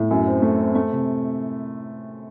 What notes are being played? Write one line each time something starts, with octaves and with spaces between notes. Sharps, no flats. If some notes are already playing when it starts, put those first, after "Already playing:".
Already playing: A2
F#2
C4
A3
C4
A3
C3